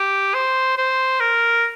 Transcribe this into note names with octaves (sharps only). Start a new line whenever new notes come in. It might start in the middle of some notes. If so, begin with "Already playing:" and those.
Already playing: G4
C5
C5
A#4